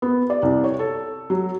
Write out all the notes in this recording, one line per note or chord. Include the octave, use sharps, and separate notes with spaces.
B3
D5
C2
C#5
A4
F#3